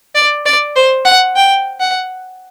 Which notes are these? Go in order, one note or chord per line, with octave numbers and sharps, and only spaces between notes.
D5
D5
C5
F#5
G5
F#5